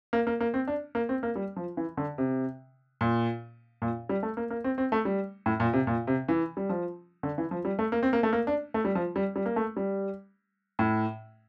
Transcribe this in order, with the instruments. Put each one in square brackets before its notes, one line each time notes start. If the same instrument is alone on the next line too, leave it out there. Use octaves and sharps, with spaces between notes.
[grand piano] A#3
A#3
A#3
C4
D4
A#3
C4
A#3
G3
F3
E3
D3
C3
A#2
A#2
G3
A3
A#3
A#3
C4
C4
A3
G3
A2
A#2
C3
A#2
C3
E3
G3
F3
D3
E3
F3
G3
A3
A#3
C4
A#3
A3
A#3
D4
A3
G3
F3
G3
G3
A#3
A3
G3
A2